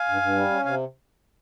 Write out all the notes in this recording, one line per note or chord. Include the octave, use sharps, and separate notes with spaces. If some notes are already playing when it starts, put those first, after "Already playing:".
Already playing: F5 G#5
G2
G2
G3
C#4
C3 F5 G#5